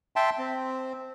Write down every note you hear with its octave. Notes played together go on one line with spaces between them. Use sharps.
E5 G5 A5 C6
C4